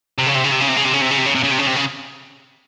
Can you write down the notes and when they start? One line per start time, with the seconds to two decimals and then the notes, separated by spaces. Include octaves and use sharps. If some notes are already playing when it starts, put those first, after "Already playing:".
0.18 C3
0.27 C#3
0.35 C3
0.44 C#3
0.51 C3
0.60 C#3
0.68 C3
0.76 C#3
0.84 C3
0.93 C#3
1.01 C3
1.10 C#3
1.18 C3
1.26 C#3
1.35 C3
1.43 C#3
1.51 C3
1.59 C#3
1.67 C3
1.76 C#3